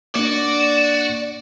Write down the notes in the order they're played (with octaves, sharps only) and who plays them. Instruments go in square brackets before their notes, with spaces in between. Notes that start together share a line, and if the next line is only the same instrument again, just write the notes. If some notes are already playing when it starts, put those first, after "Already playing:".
[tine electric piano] A#3 D4 [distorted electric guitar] F#4 [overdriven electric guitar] D5